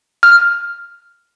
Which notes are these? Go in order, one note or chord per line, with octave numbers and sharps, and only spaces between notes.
F6